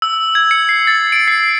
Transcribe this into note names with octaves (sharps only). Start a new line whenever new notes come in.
E6
G#6
C#7
C7
A6
D7
C7